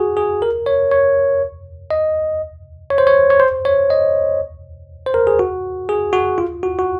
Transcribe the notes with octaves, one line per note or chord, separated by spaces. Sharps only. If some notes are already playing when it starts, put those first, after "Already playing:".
Already playing: F#4 G#4
G#4
A#4
C#5
C#5
D#5
C#5
C5
C#5
C#5
C5
C#5
D#5
C5
A#4
G#4
F#4
G#4
F#4
F4
F#4
F#4